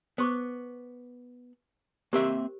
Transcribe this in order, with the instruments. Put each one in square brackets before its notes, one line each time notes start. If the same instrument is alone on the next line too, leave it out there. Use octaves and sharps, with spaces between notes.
[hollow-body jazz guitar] B3 [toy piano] C5 C#6 D6
[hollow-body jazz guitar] A#3 C4 E5 [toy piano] G4 A#4 C5